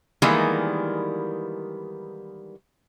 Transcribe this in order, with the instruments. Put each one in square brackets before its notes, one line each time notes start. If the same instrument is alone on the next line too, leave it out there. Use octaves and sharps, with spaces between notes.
[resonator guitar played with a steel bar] D#3 E3 G3 G#3 A#3 B3